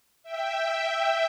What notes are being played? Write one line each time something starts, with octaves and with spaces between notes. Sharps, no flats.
E5 G5